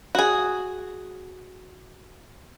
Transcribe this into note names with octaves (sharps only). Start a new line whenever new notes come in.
F#4 G#4